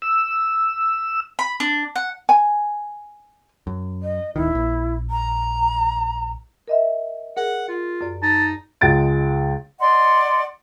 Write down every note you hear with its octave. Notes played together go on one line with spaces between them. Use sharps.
E6
B5
D4
F#5
G#5
F#2
D#5
D1 D#3 E4
A#1
A#5
A#4 D#5 E5
G#4 A#4 F#5
F4
F#2 D5
D#4 A5
C#2 G#3 A6 D7
D5 D#5 F#5 C6